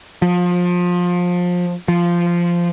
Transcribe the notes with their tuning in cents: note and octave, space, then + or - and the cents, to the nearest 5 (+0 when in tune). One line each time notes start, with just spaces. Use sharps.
F3 +25
F3 -10